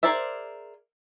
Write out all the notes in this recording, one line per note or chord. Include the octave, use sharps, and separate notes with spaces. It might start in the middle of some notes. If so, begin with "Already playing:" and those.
G#4 A#4 C5 D5 E5